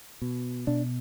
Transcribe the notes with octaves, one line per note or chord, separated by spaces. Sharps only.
B2
B2 D4